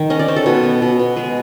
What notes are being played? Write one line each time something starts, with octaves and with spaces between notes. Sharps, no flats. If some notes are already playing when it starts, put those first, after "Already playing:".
Already playing: D#3 G5
C#4 D#5
D5
C#4 C5
A4
B2
B3
B2
B2
G#3 G#4